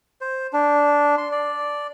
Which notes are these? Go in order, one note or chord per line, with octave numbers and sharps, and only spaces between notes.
C5
D4
C6
D5